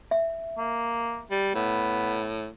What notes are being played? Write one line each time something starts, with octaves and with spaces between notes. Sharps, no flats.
E5
A#3
G3
A2 B3